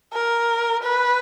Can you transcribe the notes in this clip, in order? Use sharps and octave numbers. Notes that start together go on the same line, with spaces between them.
A#4
B4